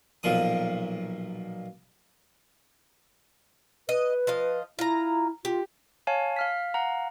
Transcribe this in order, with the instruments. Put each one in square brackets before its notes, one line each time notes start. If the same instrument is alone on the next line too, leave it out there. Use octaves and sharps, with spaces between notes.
[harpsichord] B1 A#2 F3 D#6
[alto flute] B4 [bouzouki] D#5
[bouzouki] F3 D#5 F5
[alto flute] E4 [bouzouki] F4 A#5
[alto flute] F4 [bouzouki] G4
[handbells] C#5 F5 G#5 A5
F5 F6 B6
F5 F#5 A#5